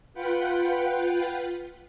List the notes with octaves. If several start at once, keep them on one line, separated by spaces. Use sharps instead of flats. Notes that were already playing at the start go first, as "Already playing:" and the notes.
F4 B4 F#5 G5